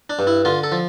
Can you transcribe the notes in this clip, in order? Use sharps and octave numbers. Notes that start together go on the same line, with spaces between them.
D4
G2
E4
D3 F4
A4
F3